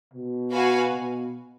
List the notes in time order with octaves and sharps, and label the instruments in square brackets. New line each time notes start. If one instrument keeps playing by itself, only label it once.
[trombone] B2
[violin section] F#4 B4 F5 G#5
[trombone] B2